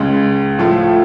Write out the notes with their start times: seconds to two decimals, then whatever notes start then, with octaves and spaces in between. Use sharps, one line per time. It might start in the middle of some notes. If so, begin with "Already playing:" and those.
Already playing: C#2 C#3 G#3
0.58 A2 F3 A3 F4